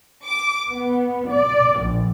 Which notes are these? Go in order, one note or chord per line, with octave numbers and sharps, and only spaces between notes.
D6
B3
D5
A#1